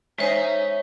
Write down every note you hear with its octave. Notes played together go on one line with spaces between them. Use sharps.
G#3 C#4 D#4 C5 E5